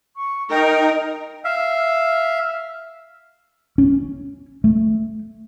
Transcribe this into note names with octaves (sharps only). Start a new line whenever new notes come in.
C#6
D#4 A#4 G5
E5 F5
C#4
A3